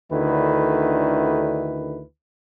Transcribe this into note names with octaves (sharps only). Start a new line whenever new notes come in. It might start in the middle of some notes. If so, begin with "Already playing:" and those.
D2 D3 D#3 E4 B4